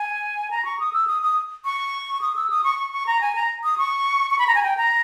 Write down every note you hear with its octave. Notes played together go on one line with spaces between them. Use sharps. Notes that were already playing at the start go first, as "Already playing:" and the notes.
Already playing: G#5
A#5
C#6
D#6
E6
D#6
D#6
C#6
D#6
E6
D#6
C#6
C#6
C#6
A#5
G#5
A#5
D#6
C#6
C#6
B5
A#5
G#5
G5
A#5